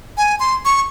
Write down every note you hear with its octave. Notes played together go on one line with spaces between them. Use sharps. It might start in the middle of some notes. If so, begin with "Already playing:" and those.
G#5
C6
C#6